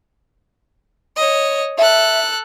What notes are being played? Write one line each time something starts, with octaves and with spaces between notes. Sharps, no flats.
C#5 D#5
A4 E5 F#6